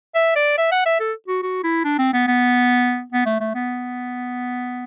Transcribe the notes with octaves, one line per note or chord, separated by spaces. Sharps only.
E5
D5
E5
F#5
E5
A4
F#4
F#4
E4
D4
C4
B3
B3
B3
A3
A3
B3